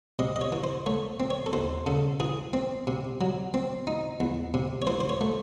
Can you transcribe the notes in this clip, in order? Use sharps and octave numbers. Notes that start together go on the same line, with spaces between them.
C3 D#5
D#5
C#5
E3
C5
A3 C#5
C4
C#5
A4
D#2 C5
C#3 A4
E3 G#4
C4
C3
F#3
C4
D#4
E2
C3
C#5
E3 C5
C5
C#5
A3